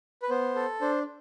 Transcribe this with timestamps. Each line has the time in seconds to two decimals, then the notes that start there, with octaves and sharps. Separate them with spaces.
0.22 B4
0.30 B3 C5
0.55 A4
0.81 D4 C5